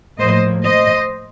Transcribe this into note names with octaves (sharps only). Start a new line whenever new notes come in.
A2 F3 A#3 C5 D#5
C5 D#5